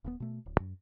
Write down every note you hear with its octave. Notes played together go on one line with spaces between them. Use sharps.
D#1 B2 B3
B2 A3
D1
F#2